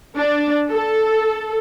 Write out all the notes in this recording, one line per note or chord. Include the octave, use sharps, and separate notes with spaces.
D4
A4